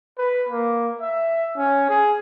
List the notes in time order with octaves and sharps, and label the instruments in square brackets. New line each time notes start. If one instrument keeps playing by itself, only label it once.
[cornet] B4
A#3
E5
C#4
G#4